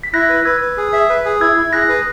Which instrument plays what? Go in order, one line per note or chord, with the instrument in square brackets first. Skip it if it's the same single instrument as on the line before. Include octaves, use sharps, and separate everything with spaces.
[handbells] B6
[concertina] E4 [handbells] F#6 A#6
[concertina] B4
[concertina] B4 [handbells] E6 G#6
[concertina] B4
G#4
E5
B4
G#4
[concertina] E4 [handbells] E6 G#6
[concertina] E4
[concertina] G#4 [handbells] F#6 A#6
[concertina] B4